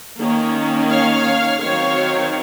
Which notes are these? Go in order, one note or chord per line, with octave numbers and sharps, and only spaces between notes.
D#3 A#3 C#4
C#5 F5
D#3 F#3 C4 C#5 F5